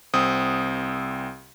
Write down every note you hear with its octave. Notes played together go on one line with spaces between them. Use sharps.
C2 C4 D#6